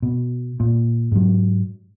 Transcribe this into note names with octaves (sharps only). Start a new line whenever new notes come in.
B2
A#2
G#2 F#3